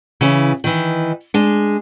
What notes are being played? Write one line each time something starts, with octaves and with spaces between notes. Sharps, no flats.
C#3 E3
D#3 E3
G#3 D4